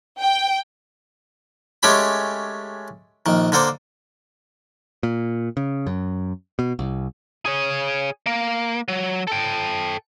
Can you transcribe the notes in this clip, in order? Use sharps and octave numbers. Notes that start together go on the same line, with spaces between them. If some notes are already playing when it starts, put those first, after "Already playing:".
G5
G#3 A3 C#4 G4 B5
A#1 D#3
D3 A#3 A4 C5
A#2
C#3
F#2
B2
C2
G#4 C#5
A#3
F#3
A4 G5